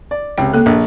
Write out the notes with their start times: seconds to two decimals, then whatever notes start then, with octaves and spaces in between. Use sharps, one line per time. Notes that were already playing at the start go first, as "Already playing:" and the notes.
0.11 D5
0.38 C#2 C3 G5
0.54 A#3 A4
0.66 A#1